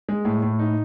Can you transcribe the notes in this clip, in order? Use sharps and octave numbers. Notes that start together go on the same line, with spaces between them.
G#3
A2
A2
D#4